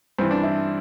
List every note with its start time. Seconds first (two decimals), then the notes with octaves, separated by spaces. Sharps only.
0.19 G2 E3 C4
0.31 D4
0.43 E4